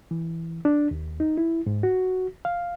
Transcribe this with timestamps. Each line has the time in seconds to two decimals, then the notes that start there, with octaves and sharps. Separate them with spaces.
0.11 E3
0.65 D4
0.91 D#2
1.20 D#4
1.38 E4
1.66 G#2
1.83 F#4
2.45 F5